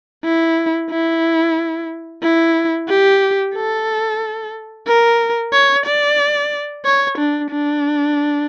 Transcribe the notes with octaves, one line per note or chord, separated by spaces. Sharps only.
E4
E4
E4
G4
A4
A#4
C#5
D5
C#5
D4
D4